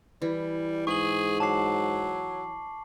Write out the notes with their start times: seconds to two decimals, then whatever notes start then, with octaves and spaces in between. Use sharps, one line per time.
0.22 E3 G3
0.87 G#2 G#4 C#6 F#7
1.40 F#3 A5 D6 C7